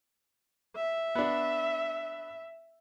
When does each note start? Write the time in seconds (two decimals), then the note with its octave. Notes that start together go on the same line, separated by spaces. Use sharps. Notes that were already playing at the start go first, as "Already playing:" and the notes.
0.76 E5
1.15 B3 D4